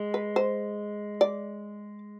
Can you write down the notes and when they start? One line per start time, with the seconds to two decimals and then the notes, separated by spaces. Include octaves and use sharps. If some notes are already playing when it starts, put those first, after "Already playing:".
Already playing: G#3
0.14 B4
0.36 C5
1.21 D5